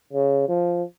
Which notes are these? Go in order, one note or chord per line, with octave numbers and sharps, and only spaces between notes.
C#3
F3